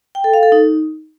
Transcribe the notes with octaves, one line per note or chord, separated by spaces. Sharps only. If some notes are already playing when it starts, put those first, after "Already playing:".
G5
A4
F5
A4
D#4